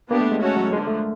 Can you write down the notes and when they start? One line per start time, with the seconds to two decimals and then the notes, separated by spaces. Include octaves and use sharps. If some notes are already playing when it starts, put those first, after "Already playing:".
0.10 A#3 B3 D4 G4
0.21 A3
0.32 G#3
0.41 C#4 F#4 A4 C#5
0.57 F#3
0.72 D3 F3 G#3 A#3
0.87 A3